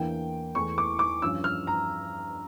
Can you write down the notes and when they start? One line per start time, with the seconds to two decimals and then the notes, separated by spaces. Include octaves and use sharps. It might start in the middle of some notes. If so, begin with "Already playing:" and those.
Already playing: E2 E3 A#3 D4 G5
0.55 E2 E3 A3 C#6
0.78 D6
0.99 D6
1.22 G2 F3 C#4 E6
1.44 F6
1.67 A#5